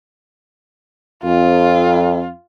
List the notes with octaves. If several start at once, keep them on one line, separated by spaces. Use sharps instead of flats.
F2 F4